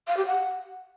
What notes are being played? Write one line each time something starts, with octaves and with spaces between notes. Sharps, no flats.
F5
G4
F#5